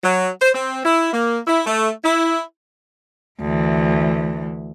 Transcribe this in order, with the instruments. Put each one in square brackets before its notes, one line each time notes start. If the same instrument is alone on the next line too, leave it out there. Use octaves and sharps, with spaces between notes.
[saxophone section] F#3
C5
C4
E4
A#3
E4
A3
E4
[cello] D2 E3